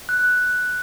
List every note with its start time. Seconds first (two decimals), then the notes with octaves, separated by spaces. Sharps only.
0.09 F#6